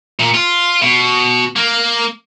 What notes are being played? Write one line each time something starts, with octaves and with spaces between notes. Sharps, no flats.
A#2
F4
B2
A#3